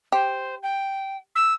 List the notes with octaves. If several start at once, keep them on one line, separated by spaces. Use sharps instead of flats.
G4 C5
G5
E6